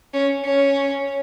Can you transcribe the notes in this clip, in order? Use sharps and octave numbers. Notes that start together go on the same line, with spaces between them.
C#4
C#4